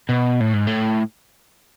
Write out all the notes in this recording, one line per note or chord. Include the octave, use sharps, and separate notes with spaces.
B2
A2
G#2
A2